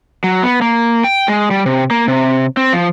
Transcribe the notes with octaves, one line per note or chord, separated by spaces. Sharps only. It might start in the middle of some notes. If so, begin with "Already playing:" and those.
F#3
B3
A#3
G5
G#3
G3
C3
A#3
C3
C4
F3